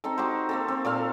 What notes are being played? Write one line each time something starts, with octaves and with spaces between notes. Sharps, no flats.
C4 D#4 A4
D#4 F#4 G4 C5
A#3 C4 A4
C4
A#2 A4 F5